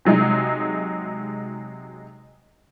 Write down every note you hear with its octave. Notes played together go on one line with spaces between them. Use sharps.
C3 F#3 G#3 D#4